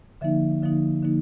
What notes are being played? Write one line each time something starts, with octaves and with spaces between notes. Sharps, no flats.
D3 F3 A#3 D#4 E5
D3 F3 A#3 D#4
D3 F3 A#3 D#4